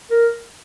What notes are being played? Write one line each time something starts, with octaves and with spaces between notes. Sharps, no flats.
A#4